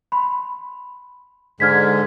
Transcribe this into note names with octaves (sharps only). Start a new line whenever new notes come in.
B5 C6
G#2 D3 G#3 F6 G#6 B6